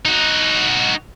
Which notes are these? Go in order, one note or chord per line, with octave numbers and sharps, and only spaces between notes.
D#4 F#4